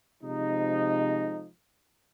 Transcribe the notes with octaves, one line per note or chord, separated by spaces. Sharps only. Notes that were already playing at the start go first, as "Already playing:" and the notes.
C3 F3 G#3 D#4